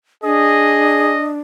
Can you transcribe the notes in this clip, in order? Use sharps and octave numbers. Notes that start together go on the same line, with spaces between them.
D4 G#4 D#5